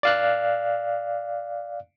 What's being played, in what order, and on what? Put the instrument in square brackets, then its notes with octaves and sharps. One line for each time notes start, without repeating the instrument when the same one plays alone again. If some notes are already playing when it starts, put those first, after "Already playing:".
[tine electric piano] D5 F5 F#6